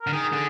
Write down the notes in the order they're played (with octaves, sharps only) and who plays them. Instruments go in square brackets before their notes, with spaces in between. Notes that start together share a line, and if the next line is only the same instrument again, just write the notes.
[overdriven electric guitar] D3 [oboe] A#4
[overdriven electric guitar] D#3 [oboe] G#4
[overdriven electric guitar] D3